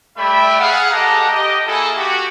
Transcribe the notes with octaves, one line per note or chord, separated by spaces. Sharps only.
G3 A3 D5 E5 G5 B5
G#4 F5 F#5
G#3 G4 A4 F#5 A5 A#5
G4 D#5
A#3 E4 G#4 A4
F#4 G4